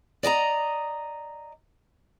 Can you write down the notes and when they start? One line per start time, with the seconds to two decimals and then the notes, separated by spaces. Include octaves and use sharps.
0.23 D5 D#5 G5 A#5